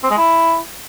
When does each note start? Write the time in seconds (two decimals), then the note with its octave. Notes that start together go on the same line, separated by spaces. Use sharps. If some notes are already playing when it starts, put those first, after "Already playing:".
0.04 C4
0.11 G#3
0.17 E4